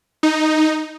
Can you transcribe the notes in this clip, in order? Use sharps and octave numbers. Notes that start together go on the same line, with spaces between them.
D#4